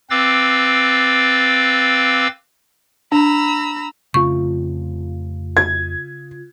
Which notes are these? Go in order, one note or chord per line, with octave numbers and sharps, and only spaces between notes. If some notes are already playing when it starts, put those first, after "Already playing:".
C4 B4 F5 D6 E6 A6
D4 A#5 B5 E6
F2 C#3 A3 C4 F4 C#6
G#6